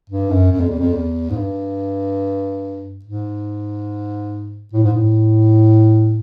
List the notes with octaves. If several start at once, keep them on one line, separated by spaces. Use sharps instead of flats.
G2
F#2
F#2
F2
E2
F2
E2
G#2
G2
G#2
A2
G#2
A2